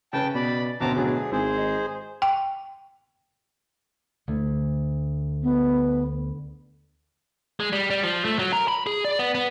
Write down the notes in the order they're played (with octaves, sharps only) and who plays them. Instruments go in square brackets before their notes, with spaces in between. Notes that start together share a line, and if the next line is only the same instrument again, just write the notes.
[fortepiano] C#3 B4 [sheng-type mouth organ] G5 A5
[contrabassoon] B2 [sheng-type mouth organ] D5 B5
[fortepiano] D2 C4 C#4 [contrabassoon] B2 [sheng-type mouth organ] A5 A#5 D6
[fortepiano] A2 D3 F#3 [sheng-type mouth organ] G#4
[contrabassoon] G#1 [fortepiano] E4 [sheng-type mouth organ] G#4 C5
[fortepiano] D#4
[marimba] G5
[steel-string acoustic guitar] D2
[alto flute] B3
[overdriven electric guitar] G#3
G3
G3
F3
A3
F#3
A#4
B5
G#4
D5
B3
B3